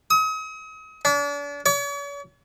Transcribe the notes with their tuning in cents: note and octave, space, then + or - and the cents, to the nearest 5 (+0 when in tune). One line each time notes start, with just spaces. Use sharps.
D#6 +40
D4 -40
C#5 +45